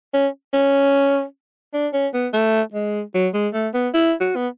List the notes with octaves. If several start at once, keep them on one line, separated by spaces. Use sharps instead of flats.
C#4
C#4
D4
C#4
B3
A3
G#3
F#3
G#3
A3
B3
E4
F#4
B3